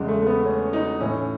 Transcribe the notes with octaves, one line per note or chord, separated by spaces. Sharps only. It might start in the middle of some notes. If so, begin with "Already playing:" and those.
Already playing: E2 C#3 E3 G#3
A3
A3
B3
C#4
D#4
A2 E3 C#4